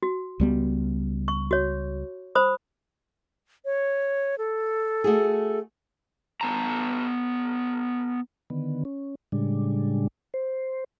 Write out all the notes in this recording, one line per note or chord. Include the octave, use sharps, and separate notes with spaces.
F#4
C#2 G3 B3
C#6
F#4 C#5
C5 B5 D#6
C#5
A4
A3 F#4 G#4
B3 A5 A#5
D3 D#3 B3
C#4
A2 C#3 G3 G#3 D4
C5